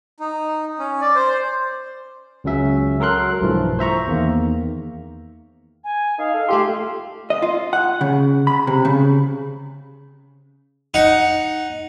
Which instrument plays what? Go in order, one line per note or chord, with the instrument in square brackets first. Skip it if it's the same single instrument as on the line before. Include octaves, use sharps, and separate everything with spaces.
[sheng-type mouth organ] D#4
C#4
D5
C5
[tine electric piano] C#2 C#3 F#3 C#4 E5
F#3 A4 A#4 C6 F#6
B1 G2 E3 F3 A3
C5 E5 A#5 C#6
E2 D#3 A#3
[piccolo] G#5
[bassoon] D#4 [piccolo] F5
[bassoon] A4
[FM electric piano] A3 F4 C6 [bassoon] G4
[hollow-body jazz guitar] D#5
F4
F#5
C#3
B5
C3
C#3
[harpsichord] D#4 F#5